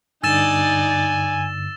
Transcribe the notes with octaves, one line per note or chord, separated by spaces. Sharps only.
G2 D3 D#4 D5 G#5 E6 A6 E7